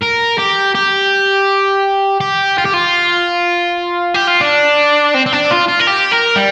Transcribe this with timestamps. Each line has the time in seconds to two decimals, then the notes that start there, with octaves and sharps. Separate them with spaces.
0.02 A#4
0.38 G4
0.75 G4
2.21 G4
2.58 F4
2.65 G4
2.74 F4
4.14 G4
4.28 F4
4.41 D4
5.14 C4
5.26 C4
5.33 D4
5.51 F4
5.69 F4
5.80 A#4
5.87 G4
6.12 A#4
6.36 G3